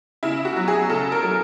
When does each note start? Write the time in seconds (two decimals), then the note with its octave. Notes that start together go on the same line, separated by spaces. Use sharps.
0.23 C#3 E4
0.45 F#4
0.56 F#3
0.68 G#4
0.89 C#3 A4
1.12 A#4
1.23 F#3